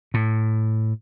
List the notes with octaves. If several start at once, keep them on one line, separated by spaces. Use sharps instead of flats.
A2